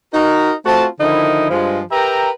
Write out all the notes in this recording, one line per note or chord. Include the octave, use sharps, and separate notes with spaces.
D#4 F#4 A#4
A3 C4 F4 F#4 A5
D3 D#3 F3 D#4 E4
G2 F3 G#3
G4 A#4 B4 E5 G5 A#5